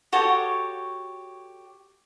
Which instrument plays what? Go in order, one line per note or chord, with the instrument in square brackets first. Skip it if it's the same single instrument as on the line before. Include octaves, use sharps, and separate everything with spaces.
[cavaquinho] F#4 G4 A4 C#5